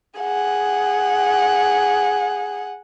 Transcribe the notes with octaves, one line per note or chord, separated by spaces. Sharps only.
G#4 F#5